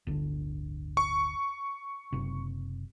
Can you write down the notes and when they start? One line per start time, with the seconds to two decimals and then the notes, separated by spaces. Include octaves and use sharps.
0.07 D1 G1 D3
0.97 C#6
2.13 F#1 C3